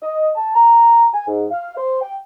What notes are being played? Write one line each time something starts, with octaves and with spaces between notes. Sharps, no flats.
D#5
A5
A#5
G#5
G#2
F5
C5
G5